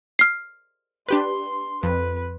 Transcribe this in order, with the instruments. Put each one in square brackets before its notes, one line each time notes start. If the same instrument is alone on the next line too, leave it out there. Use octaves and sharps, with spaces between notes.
[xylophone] F6 C7
[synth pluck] D4 G4 B4 [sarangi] C6
[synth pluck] F2 [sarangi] B4